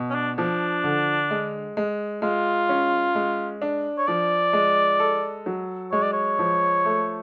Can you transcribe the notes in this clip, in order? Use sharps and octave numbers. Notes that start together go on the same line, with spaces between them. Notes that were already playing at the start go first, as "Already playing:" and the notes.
Already playing: B2
C#4
D4
F3 D4
D3
G#3
G#3
G#3 F4
C#4
G#3
D4
C#5
F3 D5
G#3
A4
F#3
G#3 C#5
D5
C#5
F3
A3